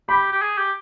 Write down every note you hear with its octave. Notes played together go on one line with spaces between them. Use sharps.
G4 B5
G4
G#4
G4